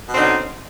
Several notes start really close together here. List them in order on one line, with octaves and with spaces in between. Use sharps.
B2 C4 D3 D#4 C#4